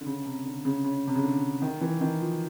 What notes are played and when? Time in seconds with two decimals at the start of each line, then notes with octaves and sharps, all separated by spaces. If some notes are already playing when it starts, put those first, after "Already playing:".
0.01 D3
0.06 C#3
0.26 C3
0.45 D3
0.65 C#3
0.84 C#3
1.07 C3
1.15 C#3
1.23 D3
1.62 D#3
1.81 E3
2.01 D#3
2.20 F3